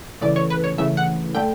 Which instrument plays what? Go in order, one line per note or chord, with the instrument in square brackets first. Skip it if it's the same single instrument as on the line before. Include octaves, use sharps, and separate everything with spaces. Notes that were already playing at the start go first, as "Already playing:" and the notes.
[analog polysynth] C#3 E3 A3 D5
C#5
B4
C#5
C#3 E3 A3 E5
F#5
D3 A3 G5